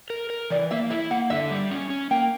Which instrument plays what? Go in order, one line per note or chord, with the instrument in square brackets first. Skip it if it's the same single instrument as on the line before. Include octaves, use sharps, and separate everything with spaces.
[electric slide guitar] A#4
A#4
[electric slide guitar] E3 [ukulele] D5
[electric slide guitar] A#3 [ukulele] E5
[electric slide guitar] E4 [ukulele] E5
[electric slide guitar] A#3 [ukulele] F#5
[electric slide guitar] D3 [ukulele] E5
[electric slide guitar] G3
C#4
C#4
[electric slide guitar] A#3 [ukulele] G5